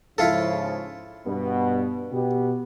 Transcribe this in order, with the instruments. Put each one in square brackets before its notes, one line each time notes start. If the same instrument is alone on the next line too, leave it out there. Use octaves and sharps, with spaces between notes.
[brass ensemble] G#2 C#3 F3 [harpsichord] E4 F4 A4
[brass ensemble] G2 B2 B3
B2 B3 G4